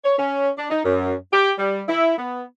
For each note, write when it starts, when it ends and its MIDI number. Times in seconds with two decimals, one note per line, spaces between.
0.04 0.18 73
0.18 0.49 61
0.58 0.70 62
0.71 0.82 63
0.85 1.14 42
1.33 1.53 67
1.58 1.83 55
1.88 2.14 64
2.18 2.42 59